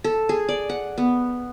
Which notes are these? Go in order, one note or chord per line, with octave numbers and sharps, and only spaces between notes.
A4
G#4
D5
F#5
B3